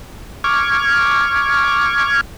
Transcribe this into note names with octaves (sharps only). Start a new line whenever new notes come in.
C#6 D6 F6 G#6